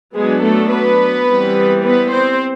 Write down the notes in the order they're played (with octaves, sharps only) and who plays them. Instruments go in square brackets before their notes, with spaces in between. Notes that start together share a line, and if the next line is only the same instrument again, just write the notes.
[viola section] F#3 G#3 B3 D4 G#4
A3 A4
B3 B4
E3 G3 C4
B3 B4
C4 C5